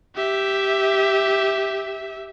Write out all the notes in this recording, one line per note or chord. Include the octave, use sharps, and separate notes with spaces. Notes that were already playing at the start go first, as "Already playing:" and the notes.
G4 E5